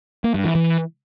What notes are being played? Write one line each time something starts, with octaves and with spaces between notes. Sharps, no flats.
A#3
G2
E3
E3